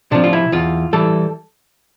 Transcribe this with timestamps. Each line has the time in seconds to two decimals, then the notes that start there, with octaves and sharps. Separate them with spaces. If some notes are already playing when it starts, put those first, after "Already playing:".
0.12 C3 F3 D4
0.24 F4
0.33 E4
0.52 E2 F4
0.93 E3 G3 A4